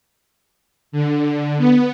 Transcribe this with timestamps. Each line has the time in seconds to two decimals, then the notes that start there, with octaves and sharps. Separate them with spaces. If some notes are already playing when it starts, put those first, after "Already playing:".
0.92 D3
1.58 B3